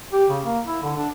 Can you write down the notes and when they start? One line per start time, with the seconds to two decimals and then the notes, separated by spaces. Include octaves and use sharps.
0.13 G4
0.30 C#3
0.44 A#3
0.67 E4
0.83 D3
0.97 D4